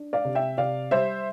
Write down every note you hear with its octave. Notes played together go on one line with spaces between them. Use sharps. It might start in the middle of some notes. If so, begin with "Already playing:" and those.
Already playing: D4
D5 F5
C3
E5 G5
C3 D5 F5
G3 C5 E5